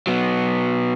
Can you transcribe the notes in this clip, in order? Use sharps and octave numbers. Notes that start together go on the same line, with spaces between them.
F#3 B3